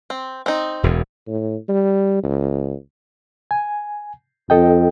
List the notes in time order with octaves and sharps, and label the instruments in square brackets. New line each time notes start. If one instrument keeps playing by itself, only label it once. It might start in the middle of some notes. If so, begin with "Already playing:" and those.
[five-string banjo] C4
C4 D#4
[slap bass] E1 E2
[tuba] A2
G3
C#2
[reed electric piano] G#5
[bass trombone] F2 [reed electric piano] A4 D#5 G5